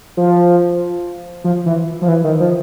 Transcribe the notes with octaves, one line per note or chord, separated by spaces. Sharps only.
F3
F3
E3
F3
E3
D#3
F3